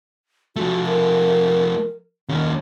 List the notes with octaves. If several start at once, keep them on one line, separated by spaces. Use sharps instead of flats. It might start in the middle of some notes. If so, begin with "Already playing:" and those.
F3 A3 F#4
A#4
D#2 D#3 C#4